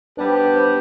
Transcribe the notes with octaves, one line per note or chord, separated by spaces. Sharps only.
G3 B3 D4 G4 B4
C5
B4
C5